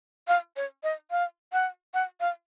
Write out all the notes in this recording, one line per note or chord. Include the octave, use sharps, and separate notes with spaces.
F5
C#5
D#5
F5
F#5
F#5
F5